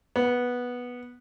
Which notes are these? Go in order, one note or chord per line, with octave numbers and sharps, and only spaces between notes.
B3